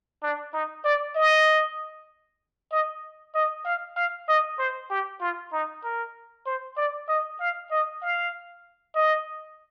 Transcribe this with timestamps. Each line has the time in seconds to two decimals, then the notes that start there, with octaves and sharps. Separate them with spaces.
0.23 D4
0.53 D#4
0.85 D5
1.16 D#5
2.72 D#5
3.35 D#5
3.65 F5
3.97 F5
4.29 D#5
4.59 C5
4.90 G4
5.21 F4
5.53 D#4
5.84 A#4
6.46 C5
6.77 D5
7.08 D#5
7.40 F5
7.71 D#5
8.02 F5
8.95 D#5